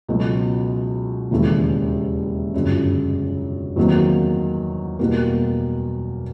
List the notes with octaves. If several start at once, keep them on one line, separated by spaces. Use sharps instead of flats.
C#2 B2 F#3 A3
E1 D#2 C#3 E3 A3
G1 F#2 C#3
E2 C3 D#3 F#3 A#3
E2 B2 G3 A#3